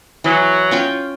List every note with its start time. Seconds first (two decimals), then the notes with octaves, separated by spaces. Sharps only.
0.24 E3 F#3
0.71 C#4 F4 G5